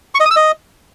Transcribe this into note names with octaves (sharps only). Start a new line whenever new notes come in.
C#6
D#5
D#6
E6
D#5